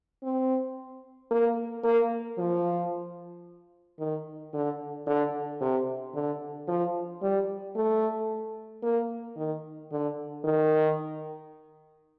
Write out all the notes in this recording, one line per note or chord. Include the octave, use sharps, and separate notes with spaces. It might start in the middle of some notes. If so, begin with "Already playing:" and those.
C4
A#3
A#3
F3
D#3
D3
D3
C3
D3
F3
G3
A3
A#3
D#3
D3
D#3